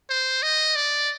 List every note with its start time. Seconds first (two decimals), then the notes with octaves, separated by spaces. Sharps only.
0.10 C5
0.43 D#5
0.76 D5